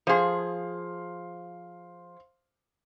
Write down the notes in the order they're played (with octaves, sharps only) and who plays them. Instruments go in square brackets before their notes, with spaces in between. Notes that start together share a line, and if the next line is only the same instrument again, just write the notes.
[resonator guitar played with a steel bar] F3 G#4 [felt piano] C5 F5 C6